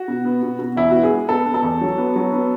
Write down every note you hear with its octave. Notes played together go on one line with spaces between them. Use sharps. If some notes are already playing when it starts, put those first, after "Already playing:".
Already playing: F#4
B2
B3
B2
B2
E2 E4
B3 F#4
G#4
G#3
B3 A4
B3
A4
E2
F#3
B3
F#3
B3